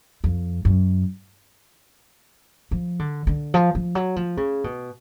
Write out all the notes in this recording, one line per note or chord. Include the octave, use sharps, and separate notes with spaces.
F2
F#2
F3
D3
D3
F3
F3
F#3
F3
C#3
B2